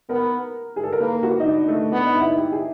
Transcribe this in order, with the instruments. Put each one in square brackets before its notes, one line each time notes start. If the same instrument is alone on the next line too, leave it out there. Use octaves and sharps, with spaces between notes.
[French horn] B3 [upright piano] A#4
[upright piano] G#4
A4
A#4
[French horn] A#3 [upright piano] B4
[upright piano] F#4
D#4
D4
A3
[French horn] B3 [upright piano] D4
[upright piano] D#4
E4
D#4
G4
G#4